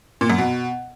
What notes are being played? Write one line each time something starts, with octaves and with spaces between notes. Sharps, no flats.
A#2
F#2
B2